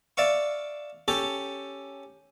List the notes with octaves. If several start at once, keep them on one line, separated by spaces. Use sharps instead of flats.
D5 E5 F5 C#6
C#4 G4 A4 C#5